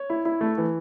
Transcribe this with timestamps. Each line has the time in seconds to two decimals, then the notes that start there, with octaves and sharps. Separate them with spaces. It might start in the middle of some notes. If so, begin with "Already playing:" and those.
Already playing: C#5
0.10 E4
0.25 E4
0.41 A3
0.58 E3